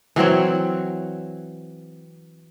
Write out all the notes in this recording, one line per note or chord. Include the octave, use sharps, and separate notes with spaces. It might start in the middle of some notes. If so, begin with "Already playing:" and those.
E3 F#3 C4 C#5